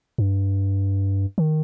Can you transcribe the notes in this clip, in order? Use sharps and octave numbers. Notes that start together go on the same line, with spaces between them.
G2
D#3